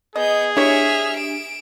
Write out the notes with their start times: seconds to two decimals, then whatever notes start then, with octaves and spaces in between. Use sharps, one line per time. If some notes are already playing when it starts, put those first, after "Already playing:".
0.16 B3 G#4 D#5 G6
0.57 D4 E4 G4 C#5 E5 F6
1.16 D7 E7